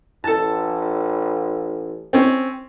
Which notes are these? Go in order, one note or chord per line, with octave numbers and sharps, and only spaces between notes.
A1 A4 A5
C4 C#4